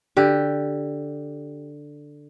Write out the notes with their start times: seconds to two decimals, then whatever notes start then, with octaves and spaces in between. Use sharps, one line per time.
0.17 D3 G4